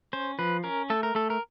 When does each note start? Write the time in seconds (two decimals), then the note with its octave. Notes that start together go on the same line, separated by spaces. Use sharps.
0.13 C#4 C5
0.39 F3 B4
0.64 C#4 A#4
0.90 A3 A4
1.03 A#4
1.15 A3 A4
1.30 A#4